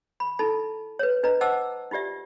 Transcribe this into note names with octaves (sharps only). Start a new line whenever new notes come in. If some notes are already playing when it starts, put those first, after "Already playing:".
B5
D#4 E4 A4 A5 B5
B4 C#5
D4 B4 D#5 A#5
C5 D#5 F#5 A5 D6 E6
D#4 F4 G4 D5 E5